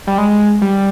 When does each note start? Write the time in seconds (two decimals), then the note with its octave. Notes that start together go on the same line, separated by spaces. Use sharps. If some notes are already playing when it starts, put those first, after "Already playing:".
0.07 G3
0.18 G#3
0.62 G3